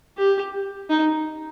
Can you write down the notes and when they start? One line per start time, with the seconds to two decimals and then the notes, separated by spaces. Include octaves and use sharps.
0.18 G4
0.90 D#4